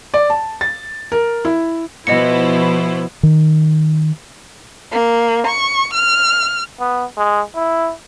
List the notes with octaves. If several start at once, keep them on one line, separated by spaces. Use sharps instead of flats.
D5
A5
A6
A#4
E4
B2 F3 B3 E4 B4 C5 D#5 C#7
D#3
A#3
C#6
F6
B3
G#3
E4